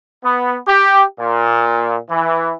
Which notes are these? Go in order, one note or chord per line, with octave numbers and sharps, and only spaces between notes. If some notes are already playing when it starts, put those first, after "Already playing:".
B3
G4
A#2
E3